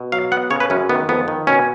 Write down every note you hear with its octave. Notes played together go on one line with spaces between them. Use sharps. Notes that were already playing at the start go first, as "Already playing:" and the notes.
Already playing: B2
F#3 F5
B3 F#5
C#3 C#5
B4
F#2 C#4
D#3 B3
F2 B3
D#3
B2 C#4